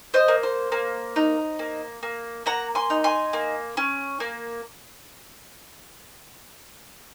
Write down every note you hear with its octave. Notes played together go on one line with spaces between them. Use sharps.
C5 D#5
A#3
C5
A#3
D#4
A#3
A#3
A#3 F#5 A#5
G#5 C6
D#4
G#5 C6
A#3
C#4
A#3